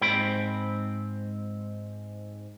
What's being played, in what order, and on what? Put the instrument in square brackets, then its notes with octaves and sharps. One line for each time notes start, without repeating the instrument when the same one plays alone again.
[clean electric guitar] G#2 C4 G5 B5